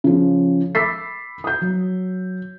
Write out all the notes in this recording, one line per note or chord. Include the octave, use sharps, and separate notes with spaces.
C#3 F3
B5 D6 E6 A6 B6 C7
D#6 G6
F#3